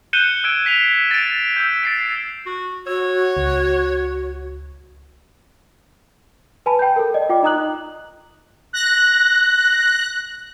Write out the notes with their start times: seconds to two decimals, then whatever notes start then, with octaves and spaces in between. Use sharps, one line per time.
0.13 F#6 G6 C#7 D#7 E7 G7
0.44 E6 G#6 D7
0.66 B6 C7 E7 F7
1.11 A6 D7
1.57 E6 G6
1.83 A6 C7 D7
2.46 F#4
2.87 F#4 C#5 E6
3.37 C#2
6.66 B4 G#5 A5 B5
6.79 G5 G6
6.96 A4 A#4
7.14 D5 D#5
7.29 F4 G5 D6
7.42 D#4 D#5 A#5 D#6 F#6 F#7
8.73 F#6 A#6